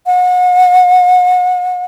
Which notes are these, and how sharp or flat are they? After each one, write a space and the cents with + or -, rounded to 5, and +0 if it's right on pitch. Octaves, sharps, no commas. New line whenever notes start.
F#5 -35